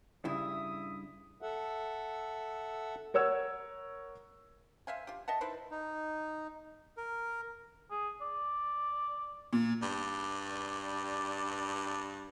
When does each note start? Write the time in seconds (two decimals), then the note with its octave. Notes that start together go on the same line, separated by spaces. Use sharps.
0.25 G2 C#3 E4 E5 D#6
1.42 A4 E5 F#5
3.14 A#4 C#5 F#5 E6 G#6
4.87 C5 E5 F5 G#5
5.07 F4 G4
5.28 D#5 E5 F#5 A5
5.41 D#4 E4 B4 C5
5.71 D#4
6.97 A#4
7.91 G#4
8.21 D5
9.53 A#2
9.82 G2 D5